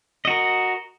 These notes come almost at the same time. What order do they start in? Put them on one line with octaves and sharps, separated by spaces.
D#5 F#4 A#4